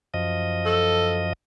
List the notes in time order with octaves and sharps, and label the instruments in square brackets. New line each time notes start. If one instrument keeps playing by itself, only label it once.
[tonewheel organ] F#2 F3 D#5
[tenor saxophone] A4